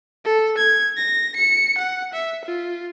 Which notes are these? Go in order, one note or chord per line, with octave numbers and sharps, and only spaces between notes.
A4
G#6
A#6
C#7
F#5
E5
F4